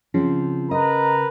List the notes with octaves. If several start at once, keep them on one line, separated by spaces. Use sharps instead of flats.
C#3 F3 C4
A#4 B4 D#5 A#5